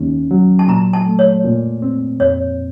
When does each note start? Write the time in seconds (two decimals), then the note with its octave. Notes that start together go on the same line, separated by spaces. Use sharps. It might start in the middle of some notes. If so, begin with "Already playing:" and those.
Already playing: D#2 C#4
0.31 F#3
0.59 A5
0.68 A#2 A#5
0.93 A5
1.06 A3
1.19 C#5
1.44 A#2
1.82 C4
2.20 F2 C#5